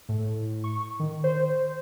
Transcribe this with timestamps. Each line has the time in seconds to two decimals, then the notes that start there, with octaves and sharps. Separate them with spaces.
0.09 A2
0.64 C#6
1.00 D#3
1.24 C5